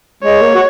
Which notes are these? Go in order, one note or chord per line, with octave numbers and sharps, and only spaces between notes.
G#3 C#5
A#3
F#4